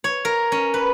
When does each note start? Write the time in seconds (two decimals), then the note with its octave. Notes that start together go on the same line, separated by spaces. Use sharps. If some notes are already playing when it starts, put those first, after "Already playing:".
0.04 C#5
0.25 A#4
0.52 C#4
0.74 B4